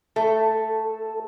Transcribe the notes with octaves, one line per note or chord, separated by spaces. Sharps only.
A3 A4